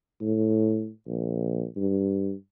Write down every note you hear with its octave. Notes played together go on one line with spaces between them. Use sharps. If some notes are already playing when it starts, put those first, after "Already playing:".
A2
A#1
G2